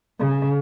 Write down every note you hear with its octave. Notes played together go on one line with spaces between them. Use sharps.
C#3